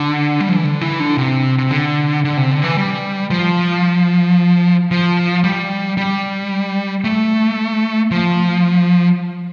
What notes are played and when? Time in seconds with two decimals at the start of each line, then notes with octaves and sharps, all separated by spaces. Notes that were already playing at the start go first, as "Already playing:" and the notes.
Already playing: D3
0.40 G3
0.49 F3
0.56 E3
0.64 D3
0.81 E3
1.00 D3
1.17 C3
1.58 C3
1.71 D3
2.24 D3
2.37 C3
2.51 D3
2.64 E3
2.77 G3
3.30 F3
4.91 F3
5.44 G3
5.97 G3
7.04 A3
8.11 F3